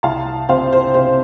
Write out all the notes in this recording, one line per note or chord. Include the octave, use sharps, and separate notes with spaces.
C2 F5 A5
C3 C5 F5
C5
C3 C5